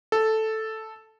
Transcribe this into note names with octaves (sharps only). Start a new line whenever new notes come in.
A4